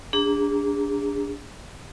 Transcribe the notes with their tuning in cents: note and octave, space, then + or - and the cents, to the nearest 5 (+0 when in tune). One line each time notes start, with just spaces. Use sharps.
D4 -20 G#4 -35 A#5 +0